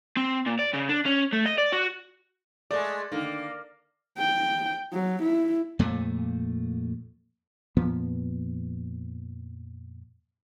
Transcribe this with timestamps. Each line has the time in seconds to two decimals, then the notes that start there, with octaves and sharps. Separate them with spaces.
0.17 C4
0.47 A#2
0.59 D5
0.74 C#3
0.89 D4
1.06 C#4
1.33 A3
1.46 D#5
1.58 D5
1.73 F#4
2.71 G#3 A3 D5
3.12 D3 D#3 A#3
4.18 G5
4.93 F#3
5.23 E4
5.79 F2 A#2 A3
7.77 F2 A#2 F3 B3